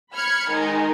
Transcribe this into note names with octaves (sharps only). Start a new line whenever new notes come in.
B5 F6 G#6 C#7
D#3 G#3 D#4 A#4